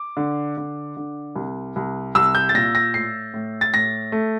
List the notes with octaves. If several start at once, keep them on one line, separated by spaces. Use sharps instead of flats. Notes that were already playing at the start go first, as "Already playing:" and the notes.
Already playing: D6
D3
D3
D3
C2
C2
C2 E6
G6
A6
A#2 A#6
A#6
A2 C7
A2
A6
A2 A#6
A3